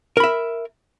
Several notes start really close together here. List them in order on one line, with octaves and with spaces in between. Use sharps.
A#4 B5 E5